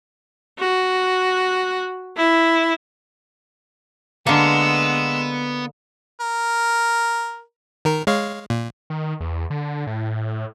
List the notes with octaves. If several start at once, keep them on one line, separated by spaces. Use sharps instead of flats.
F#4
E4
D3 G#3 A#3 B3 E6
A#4
D#3 A#4
G#3 C#5 F5
A#2
D#3
E2
D3
A2